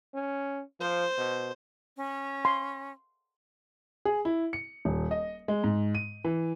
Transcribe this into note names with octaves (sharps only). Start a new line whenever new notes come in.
C#4
F3 C5
B2
C#4
C6
G#4
E4
C#7
D#1
D#5
G#3
G#2
D#7
E3